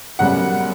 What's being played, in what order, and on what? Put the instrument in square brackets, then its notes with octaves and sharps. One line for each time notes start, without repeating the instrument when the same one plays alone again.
[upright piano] F#2 C#3 G3 B3 F#5